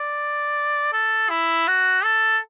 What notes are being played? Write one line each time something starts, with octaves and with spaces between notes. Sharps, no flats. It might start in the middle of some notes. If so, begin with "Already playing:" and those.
Already playing: D5
A4
E4
F#4
A4